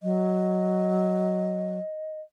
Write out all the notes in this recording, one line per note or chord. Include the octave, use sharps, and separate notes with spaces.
F#3 D#5